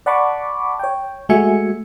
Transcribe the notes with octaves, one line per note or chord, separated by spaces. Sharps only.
D5 F#5 A5 B5 C#6 D6
C#5 G5
G#3 A3 F#4 E5 G#5 C#7